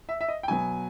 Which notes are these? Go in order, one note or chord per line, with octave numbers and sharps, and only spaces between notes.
E5
E5
D#5
G5
B2 F#3 B3 G#5